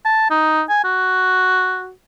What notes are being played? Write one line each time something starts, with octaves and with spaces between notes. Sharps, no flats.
A5
D#4
G#5
F#4